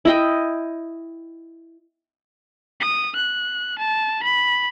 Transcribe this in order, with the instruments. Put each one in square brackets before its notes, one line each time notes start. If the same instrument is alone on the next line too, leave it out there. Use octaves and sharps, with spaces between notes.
[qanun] E4 D#5 G5
[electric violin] D#6
F#6
A5
B5